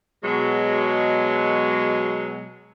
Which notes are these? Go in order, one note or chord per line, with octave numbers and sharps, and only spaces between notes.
B2 F#3 G#3